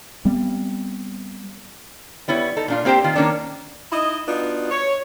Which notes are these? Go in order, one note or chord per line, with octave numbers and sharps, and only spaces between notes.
G3 B3 C4
G3 B3 E4 C#5
D#4 A4
A#2 D4 F4
A#3 C4 G4 C5 G5
D#3 F4
D#3 A#3 C#4 D4
D#4 E4 D#5
B3 D4 D#4 F4 F#4
C#5